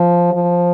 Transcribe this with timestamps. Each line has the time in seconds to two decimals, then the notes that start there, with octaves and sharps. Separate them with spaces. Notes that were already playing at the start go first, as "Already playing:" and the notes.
Already playing: F3
0.34 F3